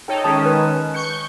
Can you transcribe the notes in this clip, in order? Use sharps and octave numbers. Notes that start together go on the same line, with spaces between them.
D#4 A4 C#5 G5
D#3 G#3 C#4 A5 D#6
B4
C#6 G6 C#7